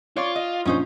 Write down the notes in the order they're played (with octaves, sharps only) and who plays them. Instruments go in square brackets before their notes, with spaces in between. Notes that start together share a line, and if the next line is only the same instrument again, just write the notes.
[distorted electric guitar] F4 [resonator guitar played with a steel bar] C#5 D5
[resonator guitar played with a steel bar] D#5
[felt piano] A#1 [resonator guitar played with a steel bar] C#4 D#4 C5